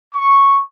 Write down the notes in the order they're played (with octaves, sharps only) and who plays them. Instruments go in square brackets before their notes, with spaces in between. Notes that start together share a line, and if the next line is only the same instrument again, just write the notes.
[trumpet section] C#6